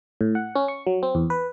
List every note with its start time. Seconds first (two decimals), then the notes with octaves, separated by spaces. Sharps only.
0.21 A2
0.35 F#5
0.55 C#4
0.68 C#6
0.87 F#3
1.03 C4
1.15 E2
1.30 B4